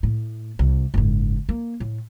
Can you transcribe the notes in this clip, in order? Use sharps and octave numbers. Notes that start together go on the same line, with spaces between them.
A2
C2
F#1 G#2
A#3
A2